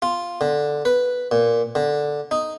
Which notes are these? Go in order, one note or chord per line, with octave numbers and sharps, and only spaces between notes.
F4
D3
B4
A#2
D3
D#4